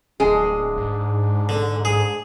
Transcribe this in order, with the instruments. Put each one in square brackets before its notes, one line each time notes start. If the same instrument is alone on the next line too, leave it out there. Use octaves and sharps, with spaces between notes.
[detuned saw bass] D1 [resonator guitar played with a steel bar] G#3 G#4 [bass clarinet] D4
[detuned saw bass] G#2
[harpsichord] D3
G#4